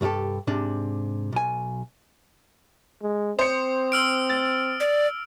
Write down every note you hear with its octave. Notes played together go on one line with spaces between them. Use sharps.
C2 G2 D4 G4 A4
G#2 C3 D4
B1 G#5
G#3
C4 C5 D#6 C#7
E6 F6 D7
A6
D5